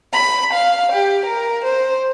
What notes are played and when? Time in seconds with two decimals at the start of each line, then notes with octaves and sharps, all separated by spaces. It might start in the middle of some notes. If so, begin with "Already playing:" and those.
0.14 B5
0.54 F5
0.93 G4
1.26 A#4
1.66 C5